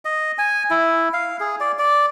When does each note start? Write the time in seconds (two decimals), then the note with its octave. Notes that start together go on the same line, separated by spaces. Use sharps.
0.05 D#5
0.38 G#5
0.70 E4
1.13 F5
1.40 G#4
1.60 D5
1.79 D5